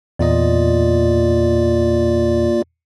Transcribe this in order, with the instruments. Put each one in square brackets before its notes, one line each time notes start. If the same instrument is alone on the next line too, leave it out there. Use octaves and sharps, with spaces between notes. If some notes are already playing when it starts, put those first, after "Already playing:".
[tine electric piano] E2 A#2 D#5 [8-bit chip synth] A#3 F4 D5